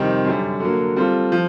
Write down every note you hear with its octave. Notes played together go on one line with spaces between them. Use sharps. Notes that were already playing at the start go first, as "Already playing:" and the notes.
Already playing: F2 C3 D#3 G3 C4
F#2 D3 G3
D3 F#3 A#3
G3 C4 F4 A4
F3